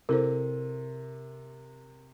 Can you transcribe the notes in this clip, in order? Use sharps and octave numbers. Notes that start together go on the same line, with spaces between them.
C3 E4 A4 A#4 C5